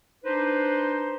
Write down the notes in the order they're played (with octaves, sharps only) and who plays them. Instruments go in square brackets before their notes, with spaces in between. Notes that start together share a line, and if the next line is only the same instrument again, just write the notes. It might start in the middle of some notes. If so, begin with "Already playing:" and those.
[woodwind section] D4 D#4 B4 C5